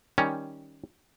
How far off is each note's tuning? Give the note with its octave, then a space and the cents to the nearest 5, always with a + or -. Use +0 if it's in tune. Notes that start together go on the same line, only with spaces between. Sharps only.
D#3 +0 G3 +0 C#4 +0